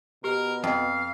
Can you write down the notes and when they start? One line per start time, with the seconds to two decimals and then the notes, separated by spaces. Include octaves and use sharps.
0.24 B2 G4 A#4
0.64 F2 D#5 F5